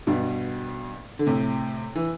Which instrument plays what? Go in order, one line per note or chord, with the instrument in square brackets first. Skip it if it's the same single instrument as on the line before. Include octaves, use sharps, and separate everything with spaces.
[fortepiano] G2 B2
D3
A2 C3
E3